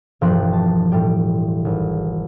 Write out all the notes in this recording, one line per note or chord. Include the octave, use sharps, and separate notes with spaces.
E1 G2 F3 G5 C6 F#6
A5
A2 G3 G5
G#1